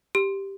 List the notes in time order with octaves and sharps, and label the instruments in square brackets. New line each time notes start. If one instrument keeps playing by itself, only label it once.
[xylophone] G4